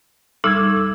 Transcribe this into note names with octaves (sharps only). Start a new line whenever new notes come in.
G3 D#4 A4 D6 E6 G#6